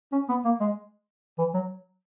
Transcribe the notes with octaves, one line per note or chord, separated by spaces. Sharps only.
C#4
B3
A#3
G#3
E3
F#3